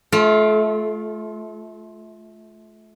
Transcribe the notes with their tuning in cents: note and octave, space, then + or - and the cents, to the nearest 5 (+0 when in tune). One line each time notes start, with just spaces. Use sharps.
A3 -30 F4 +0